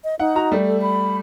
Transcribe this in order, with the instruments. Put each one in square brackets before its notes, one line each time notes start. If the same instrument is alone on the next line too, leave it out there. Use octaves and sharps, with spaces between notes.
[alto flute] D#5
[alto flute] D#4 [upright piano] F#5
[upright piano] F#4 A#5
G3 A3
[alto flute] A4
B5